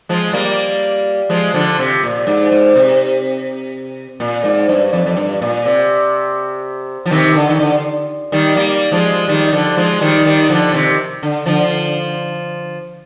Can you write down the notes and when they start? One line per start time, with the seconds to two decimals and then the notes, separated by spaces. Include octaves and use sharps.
0.09 F3 G#3
0.33 G3 A#3
1.30 F3 G#3
1.54 D3 F3
1.79 C3
2.03 A#2
2.27 G#2
2.52 G#2
2.76 C3
4.20 A#2
4.44 G#2
4.69 G2
4.93 F2
5.06 F2
5.17 G2
5.41 A#2
5.65 C3
7.06 F3
7.11 C3 D#3
7.35 D3
7.50 D#3
7.59 D3
8.32 D#3 G3
8.56 G3 A#3
8.92 F3 G#3
9.28 D#3 G3
9.52 D3 F3
9.77 F3 G#3
10.01 D#3 G3
10.25 D#3 G3
10.49 D3 F3
10.73 C3 D#3
11.23 D3
11.46 D3 F3